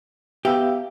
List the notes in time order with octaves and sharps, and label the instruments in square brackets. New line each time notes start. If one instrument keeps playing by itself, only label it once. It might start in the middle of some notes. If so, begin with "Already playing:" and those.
[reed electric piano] B3 E5 F5 [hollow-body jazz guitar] G4